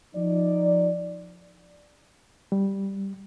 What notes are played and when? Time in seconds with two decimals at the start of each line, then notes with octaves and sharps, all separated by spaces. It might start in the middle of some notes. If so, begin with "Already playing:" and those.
0.15 F3 D#4 D5
2.52 G3